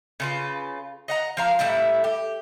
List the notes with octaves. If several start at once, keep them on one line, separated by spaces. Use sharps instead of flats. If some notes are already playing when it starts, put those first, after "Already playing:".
C#3 F4 B4
D#5 F#5 A#5
F3 F5 A#5
A2 G3 E4 E5
G4